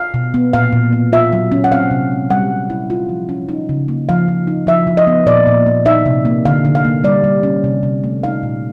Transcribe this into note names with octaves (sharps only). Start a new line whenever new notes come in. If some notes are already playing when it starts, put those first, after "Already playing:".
Already playing: F5
B2
B3
A#2 F5
A#2
B3
F4 E5
F#3
C#4
F#5
C4 F5
C3
G#3
G3 F#5
G3
E4
F4
F3
C#4
D#4
C#3
A#3
F3 F5
F3
D#4
F3 E5
F3
D#5
B3
A#2 D5
A#2
A#3
D#4 E5
C3
A#3
D3 F5
D3
F5
A#3
G3 D5
G3
C#4
C3
C3
A3
D#4 F5
A#2